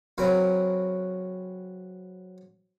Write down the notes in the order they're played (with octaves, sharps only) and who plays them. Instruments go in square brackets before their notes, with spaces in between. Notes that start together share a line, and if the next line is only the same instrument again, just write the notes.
[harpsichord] C#3 F#3 C4 F#4 A#4 B4